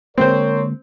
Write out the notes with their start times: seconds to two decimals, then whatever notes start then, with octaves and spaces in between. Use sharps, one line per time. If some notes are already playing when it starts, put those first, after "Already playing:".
0.18 D3 G#3 A#3 C4 A#4 C5 C#5